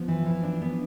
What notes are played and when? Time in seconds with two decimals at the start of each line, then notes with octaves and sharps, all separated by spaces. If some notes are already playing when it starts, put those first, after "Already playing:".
Already playing: F3 B3
0.08 E3
0.26 E3
0.43 D4
0.62 B3